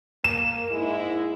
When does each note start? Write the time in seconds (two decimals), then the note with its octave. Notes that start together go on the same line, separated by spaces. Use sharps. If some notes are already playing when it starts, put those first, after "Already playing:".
0.24 A#3 E7
0.69 G#2 G#3 E4